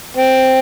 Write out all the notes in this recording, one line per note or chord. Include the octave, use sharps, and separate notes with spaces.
C4